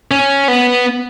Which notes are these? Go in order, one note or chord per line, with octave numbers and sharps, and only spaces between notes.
C#4
B3